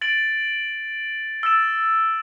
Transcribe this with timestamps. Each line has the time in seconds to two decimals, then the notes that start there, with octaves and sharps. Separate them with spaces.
0.01 A6 D7 F#7
1.43 E6 A6 E7